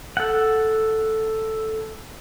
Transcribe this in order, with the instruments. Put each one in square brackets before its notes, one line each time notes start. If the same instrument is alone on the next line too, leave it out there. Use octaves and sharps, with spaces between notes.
[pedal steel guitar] A4 F#5